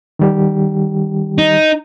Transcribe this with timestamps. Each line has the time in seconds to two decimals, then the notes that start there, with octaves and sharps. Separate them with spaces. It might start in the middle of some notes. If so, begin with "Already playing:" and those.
0.19 D#3 G3 G4
1.38 D#4